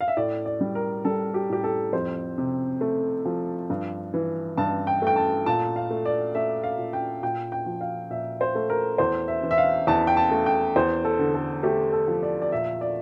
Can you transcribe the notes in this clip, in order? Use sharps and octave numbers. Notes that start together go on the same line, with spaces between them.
F5
E5
A2 D5
D5
G3
A#4
G3 A4
G4
A2 G4
A4
F2 C5
C3
A3
F3
G2
E3
G2 A5
G5
A3 G5
A5
A#2 A5
F5
A3
D5
A3 E5
F5
A#2
G5
A#2 G5
G5
F3
F5
A#2 E5
C5
A3
A#4
E2 C5
E5
E3
E5
F5
E2 A5
G5
A5
A3
G5
E2 C5
A4
D3
A4
A3 G4
A4
F3
D5
D5
A#2 E5
D5